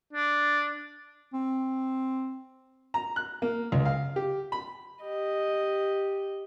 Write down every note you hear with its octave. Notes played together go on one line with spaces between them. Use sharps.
D4
C4
A#5
F#6
A#3
C#2
F5
G4
B5
G4 D#5